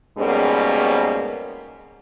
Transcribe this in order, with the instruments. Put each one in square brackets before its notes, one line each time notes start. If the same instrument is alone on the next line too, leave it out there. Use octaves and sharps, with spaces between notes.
[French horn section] F2 G#2 B2 G3 A#3 C#4